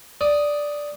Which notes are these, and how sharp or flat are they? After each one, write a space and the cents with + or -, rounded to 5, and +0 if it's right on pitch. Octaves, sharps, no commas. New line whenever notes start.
D5 +0 D#6 +0